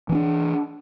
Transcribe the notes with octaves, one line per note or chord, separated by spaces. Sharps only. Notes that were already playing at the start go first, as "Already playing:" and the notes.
E3 C#4 D4